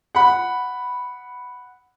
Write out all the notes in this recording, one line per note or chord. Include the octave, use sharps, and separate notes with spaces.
F#5 B5